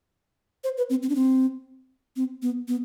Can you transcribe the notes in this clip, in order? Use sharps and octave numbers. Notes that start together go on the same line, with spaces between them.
C5
B4
C4
C4
D4
C4
C4
B3
B3